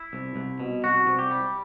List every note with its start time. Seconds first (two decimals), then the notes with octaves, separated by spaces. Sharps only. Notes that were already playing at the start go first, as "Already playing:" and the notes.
Already playing: E4
0.13 C2
0.36 C2
0.60 B2
0.84 C2 F#4
1.07 C2
1.19 G4
1.31 G3